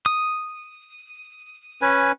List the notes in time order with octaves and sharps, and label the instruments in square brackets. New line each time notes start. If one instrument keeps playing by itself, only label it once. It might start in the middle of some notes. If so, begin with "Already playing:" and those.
[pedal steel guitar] D#6
[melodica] C#4 B4 G#5